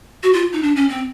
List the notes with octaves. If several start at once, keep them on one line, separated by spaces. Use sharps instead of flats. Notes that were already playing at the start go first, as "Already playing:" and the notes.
F#4
F4
D#4
D4
C#4
C4